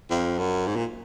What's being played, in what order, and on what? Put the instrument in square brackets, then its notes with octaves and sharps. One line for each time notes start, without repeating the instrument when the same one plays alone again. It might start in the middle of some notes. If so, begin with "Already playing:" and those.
[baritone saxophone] F2
F#2
G#2
A#2